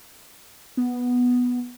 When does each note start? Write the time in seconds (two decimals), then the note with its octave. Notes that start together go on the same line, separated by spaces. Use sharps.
0.77 B3